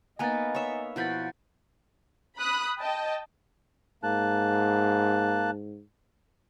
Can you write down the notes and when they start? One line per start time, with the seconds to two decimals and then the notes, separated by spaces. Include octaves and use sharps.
0.19 A#3 B3 D#4 G#5 A#5 A6
0.55 C#5 E5
0.96 B2 F3 E4 F#5 B5 G6 A6
2.37 B5 D#6 F#6
2.80 D#5 G5 A5
4.04 G#2 A#3 A5 F#6